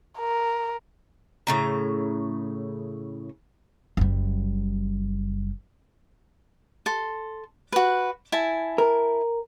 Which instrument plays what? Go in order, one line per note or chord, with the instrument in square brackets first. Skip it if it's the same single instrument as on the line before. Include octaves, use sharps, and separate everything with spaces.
[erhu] A#4
[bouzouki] A2 C#3 A#5
[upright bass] F#1 G3
[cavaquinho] A4 C6
F#4 B4
E4 G#5 A5
[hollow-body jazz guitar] A#4